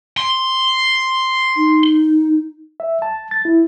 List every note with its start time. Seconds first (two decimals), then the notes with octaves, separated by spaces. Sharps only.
0.18 C6
1.57 D#4
2.80 E5
3.02 A5
3.31 A6
3.45 E4